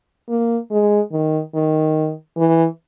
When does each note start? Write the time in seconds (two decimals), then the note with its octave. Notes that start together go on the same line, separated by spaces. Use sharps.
0.29 A#3
0.71 G#3
1.12 D#3
1.54 D#3
2.37 E3